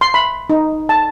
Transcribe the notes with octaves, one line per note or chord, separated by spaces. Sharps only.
C6
B5
D#4
A5